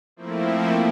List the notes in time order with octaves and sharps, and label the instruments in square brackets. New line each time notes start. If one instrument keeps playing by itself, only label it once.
[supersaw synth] F3 A3 A#3 C4 E4